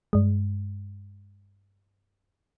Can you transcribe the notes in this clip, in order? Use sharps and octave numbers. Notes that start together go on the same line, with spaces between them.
G2 G#3